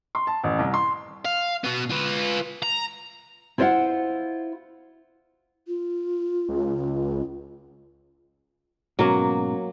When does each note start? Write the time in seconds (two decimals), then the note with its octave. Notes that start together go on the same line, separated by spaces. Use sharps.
0.15 C6
0.27 A5
0.44 A1
0.59 C2
0.74 C6
1.25 F5
1.64 B2 B3
1.90 F4 B4
2.63 A#5
3.58 E4 F4 C5 D#5 F5 F#5
5.68 F4
6.49 C#2
8.99 G#2 B2 F#3 A#3 C#4